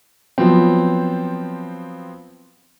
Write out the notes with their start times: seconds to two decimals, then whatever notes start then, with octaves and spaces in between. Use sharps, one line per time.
0.38 F3 F#3 B3 C4